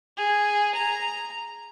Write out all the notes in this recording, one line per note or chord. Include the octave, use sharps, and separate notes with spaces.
G#4
A#5